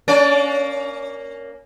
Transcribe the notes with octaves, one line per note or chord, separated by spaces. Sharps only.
A#3 C#4 D5